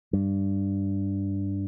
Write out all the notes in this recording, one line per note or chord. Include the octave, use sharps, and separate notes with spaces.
G2